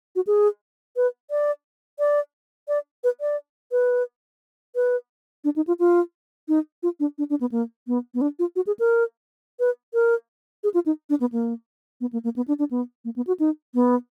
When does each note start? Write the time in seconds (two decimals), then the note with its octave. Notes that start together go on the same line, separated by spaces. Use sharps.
0.16 F#4
0.27 G#4
0.96 B4
1.30 D5
1.99 D5
2.68 D5
3.04 B4
3.21 D5
3.72 B4
4.75 B4
5.44 D4
5.56 D#4
5.67 F4
5.79 F4
6.48 D#4
6.83 F4
7.00 D4
7.18 D4
7.30 D4
7.41 B3
7.52 A#3
7.87 B3
8.14 B3
8.21 D4
8.39 F4
8.56 F#4
8.67 G#4
8.79 A#4
9.60 B4
9.94 A#4
10.64 G#4
10.74 F4
10.86 D#4
11.10 D4
11.20 B3
11.32 A#3
12.01 B3
12.13 A#3
12.24 A#3
12.36 B3
12.48 D4
12.59 D4
12.71 B3
13.05 A#3
13.16 B3
13.27 F#4
13.40 D#4
13.74 B3